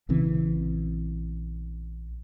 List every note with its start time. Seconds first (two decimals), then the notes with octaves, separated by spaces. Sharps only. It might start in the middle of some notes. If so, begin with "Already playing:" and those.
0.09 A#1 C#3 E3 C4